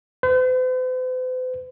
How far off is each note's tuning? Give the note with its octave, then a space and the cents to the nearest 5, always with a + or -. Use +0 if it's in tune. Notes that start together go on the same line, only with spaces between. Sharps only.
C5 -45